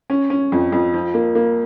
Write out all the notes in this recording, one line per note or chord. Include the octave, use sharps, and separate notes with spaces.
C#4
C#4
F2
F2
F3
A#3
A#3